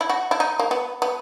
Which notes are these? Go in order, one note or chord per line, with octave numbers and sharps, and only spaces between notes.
E4
F#4
E4
D#4
A#3
B3
B3